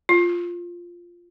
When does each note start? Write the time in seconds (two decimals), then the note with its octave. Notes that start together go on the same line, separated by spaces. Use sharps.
0.09 F4